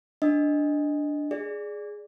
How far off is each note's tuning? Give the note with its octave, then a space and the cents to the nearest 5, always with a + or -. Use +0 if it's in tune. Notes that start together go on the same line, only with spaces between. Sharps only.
D4 +0 D#5 +0
G#4 +0 D5 +0